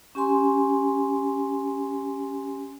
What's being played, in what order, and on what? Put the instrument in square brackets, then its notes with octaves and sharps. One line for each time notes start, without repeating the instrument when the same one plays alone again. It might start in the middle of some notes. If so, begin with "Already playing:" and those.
[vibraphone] C#4 G4 G#5 C6